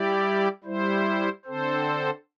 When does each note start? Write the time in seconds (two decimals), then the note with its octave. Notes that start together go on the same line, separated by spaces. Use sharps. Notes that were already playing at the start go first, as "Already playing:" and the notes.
Already playing: G3 E4 G4 D5
0.64 G3 E4 C5
1.45 D3 C4 A4 C5